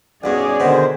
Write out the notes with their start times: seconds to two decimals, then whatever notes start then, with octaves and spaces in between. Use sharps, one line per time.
0.24 B1 G2 C#4 G#4 D5
0.60 B2 D3 D#3 C5